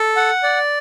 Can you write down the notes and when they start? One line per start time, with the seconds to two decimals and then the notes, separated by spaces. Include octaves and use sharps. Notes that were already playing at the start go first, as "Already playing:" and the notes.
Already playing: A4
0.16 F#5
0.43 D5